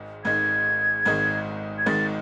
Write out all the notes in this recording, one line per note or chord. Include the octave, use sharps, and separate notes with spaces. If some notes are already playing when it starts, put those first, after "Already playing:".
Already playing: G#1 G#2 D#3 G#3 D#4
G#1 G#2 D#3 G#3 D#4 G#6
G#1 G#2 D#3 G#3 D#4
G#6
G#1 G#2 D#3 G#3 D#4 A6